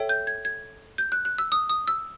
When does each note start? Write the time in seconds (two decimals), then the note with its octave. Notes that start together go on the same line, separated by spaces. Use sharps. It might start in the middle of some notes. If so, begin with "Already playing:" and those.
Already playing: A4 C#5 E5 G5
0.09 G6
0.27 G#6
0.45 G#6
0.98 G6
1.12 F#6
1.25 F#6
1.38 E6
1.52 D#6
1.69 D#6
1.88 E6